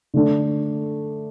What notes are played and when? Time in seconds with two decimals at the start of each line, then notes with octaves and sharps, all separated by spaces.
0.14 D3 A3 D4